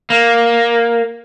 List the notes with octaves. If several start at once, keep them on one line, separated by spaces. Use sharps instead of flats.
A#3